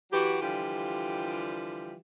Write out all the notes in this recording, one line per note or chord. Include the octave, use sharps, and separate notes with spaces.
E3 F#3 F#4 G4
D3 E3 F3 G3 F4 G4